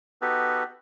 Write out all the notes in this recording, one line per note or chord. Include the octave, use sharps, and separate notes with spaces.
B3 D#4 F#4 G4 A4 B4